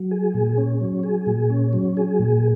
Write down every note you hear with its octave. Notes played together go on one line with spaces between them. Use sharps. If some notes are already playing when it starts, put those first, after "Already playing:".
Already playing: F#3
G#4
A#2
C#4
F#3
G#4
A#2
C#4
F#3
G#4
A#2